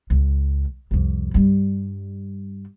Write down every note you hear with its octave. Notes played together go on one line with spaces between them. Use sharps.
C#2
C2 F2
G2 G3